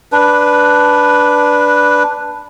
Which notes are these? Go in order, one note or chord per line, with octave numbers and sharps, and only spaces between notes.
D4 B4